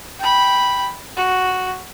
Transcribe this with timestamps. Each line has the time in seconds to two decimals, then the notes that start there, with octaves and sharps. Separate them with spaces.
0.20 G5 B5
1.17 F#4